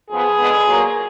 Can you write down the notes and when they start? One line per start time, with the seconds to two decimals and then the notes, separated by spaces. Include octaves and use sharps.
0.09 F2 F3 B3 G#4
0.38 D3 G#3 B3
0.65 A#2 F#3 A#3